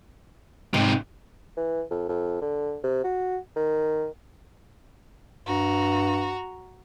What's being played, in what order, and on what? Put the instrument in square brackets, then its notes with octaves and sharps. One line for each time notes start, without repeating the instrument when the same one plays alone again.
[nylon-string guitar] G#2 [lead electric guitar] C3 D#4
[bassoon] E3
F2
F2
D3
C3
F#4
D#3
[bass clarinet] G2 [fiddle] F#4 A#5